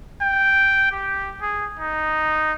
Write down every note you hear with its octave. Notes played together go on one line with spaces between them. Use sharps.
G5
G4
G#4
D#4